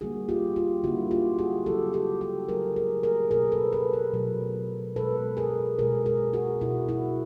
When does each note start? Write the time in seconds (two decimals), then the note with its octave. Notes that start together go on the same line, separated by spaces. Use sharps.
0.01 D3 G3 A#3 F#4 G#4
0.29 F4 G4
0.56 F4 G4
0.84 D3 G3 A#3 E4 F#4
1.11 F4 G4
1.38 F#4 G#4
1.66 C#3 F#3 A3 G4 A4
1.93 G4 A4
2.21 G4 A4
2.49 C#3 F#3 A3 G#4 A#4
2.76 G#4 A#4
3.03 G#4 A#4
3.31 B2 F#3 A3 G#4 A#4
3.52 A4 B4
3.73 A4 B4
3.93 G#4 A#4
4.14 B2 F#3 A3
4.96 B2 G#3 A4 B4
5.37 G#4 A#4
5.79 B2 G#3 G#4 A#4
6.06 G#4 A#4
6.33 F#4 G#4
6.61 B2 G#3 E4 F#4
6.88 E4 F#4